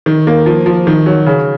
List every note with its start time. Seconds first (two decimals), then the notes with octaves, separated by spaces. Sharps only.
0.06 D#3
0.27 A#3
0.46 F3
0.66 F3
0.87 D#3
1.06 F#3
1.26 C#3